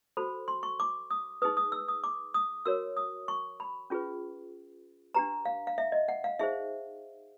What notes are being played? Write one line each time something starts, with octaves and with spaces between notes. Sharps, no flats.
F#4 A4 C5 B5
C6
C#6
D6
D#6
D#4 G#4 B4 D#6
D#6
E6
D#6
D6
D#6
F#4 A#4 C#5 E6
D#6
C#6
B5
C#4 F4 G#4 B4
D4 G4 B4 A#5
F5
F5
E5
D#5
F#5
F5
D#4 G#4 C5 E5